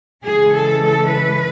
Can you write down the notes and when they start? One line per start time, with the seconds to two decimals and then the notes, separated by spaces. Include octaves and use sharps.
0.23 C#3 E3 G#3 G#4
0.53 A4
0.83 A4
1.12 B4